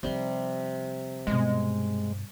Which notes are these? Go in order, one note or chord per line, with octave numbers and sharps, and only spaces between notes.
C3 F3 G3 D#4 C6
G2 B2 G#3